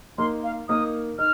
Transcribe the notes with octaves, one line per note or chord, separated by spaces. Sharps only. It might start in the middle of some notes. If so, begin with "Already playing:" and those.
A#3 D#4 A#4 C6
F5
A#3 D#4 A#4 D#6
D#4 F6